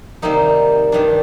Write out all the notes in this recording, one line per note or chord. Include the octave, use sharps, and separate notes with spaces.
C3 D#3 G3 A#3 D#4
G2 D#3 G3 D4